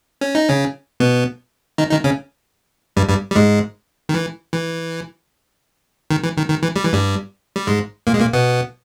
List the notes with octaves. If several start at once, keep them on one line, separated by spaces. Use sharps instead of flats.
C#4
D#4
C#3 C#4
B2 B3
D#3 D#4
D#3 D#4
C#3 C#4
G2 G3
G2 G3
G3
G#2 G#3
D#3
E3
E3
D#3
E3
D#3
D#3
E3
G3
E3
G2 G3
G3
G#2 G#3
A#2 A#3
G#3
A#2 A#3
B2 B3